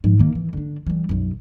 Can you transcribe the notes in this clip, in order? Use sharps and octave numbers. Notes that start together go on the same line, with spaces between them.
G#2 F3
D#3 A#3
E3
D3 D4
E3 G3
B1 F#2